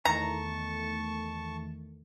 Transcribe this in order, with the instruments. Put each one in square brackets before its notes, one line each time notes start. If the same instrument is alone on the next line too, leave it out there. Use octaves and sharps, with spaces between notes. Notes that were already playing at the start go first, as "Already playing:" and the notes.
[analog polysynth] E2 D#3 A3 [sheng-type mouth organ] A5 C#6 [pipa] A#5